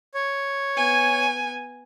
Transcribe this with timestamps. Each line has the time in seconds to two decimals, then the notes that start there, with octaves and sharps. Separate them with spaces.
0.14 C#5
0.76 B3 G#5